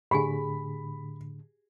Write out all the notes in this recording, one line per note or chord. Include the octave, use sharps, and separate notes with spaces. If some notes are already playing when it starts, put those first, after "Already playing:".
A2 D3 G4 G#4 G#5 B5